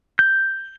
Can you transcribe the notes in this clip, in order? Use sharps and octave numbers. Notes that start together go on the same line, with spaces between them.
G6